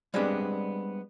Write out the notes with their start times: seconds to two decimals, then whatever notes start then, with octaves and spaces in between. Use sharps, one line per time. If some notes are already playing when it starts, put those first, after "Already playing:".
0.14 G3 G#3 B3 C4 D4 G4